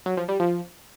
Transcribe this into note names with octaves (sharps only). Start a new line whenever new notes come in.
F#3
F3
G3
F3